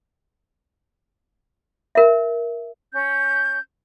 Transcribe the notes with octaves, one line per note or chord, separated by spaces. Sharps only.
A#4 E5
C#4 G6